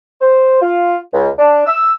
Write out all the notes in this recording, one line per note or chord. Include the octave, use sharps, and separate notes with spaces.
C5
F4
C#2
D4
E6